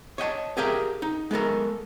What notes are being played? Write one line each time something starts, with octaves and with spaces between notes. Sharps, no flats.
C#5 D#5 G5 A5
G4 G#4 A#4 E5 F5 G5
D#4
G#3 B3 A4 A#4